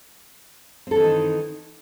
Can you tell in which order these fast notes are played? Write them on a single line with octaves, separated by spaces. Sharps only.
C4 A4 E3 D#3 D#4